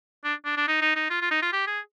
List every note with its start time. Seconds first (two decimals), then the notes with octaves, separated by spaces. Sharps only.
0.24 D4
0.45 D4
0.57 D4
0.68 D#4
0.81 D#4
0.96 D#4
1.10 F4
1.21 F4
1.31 D#4
1.42 F4
1.53 G4
1.67 G#4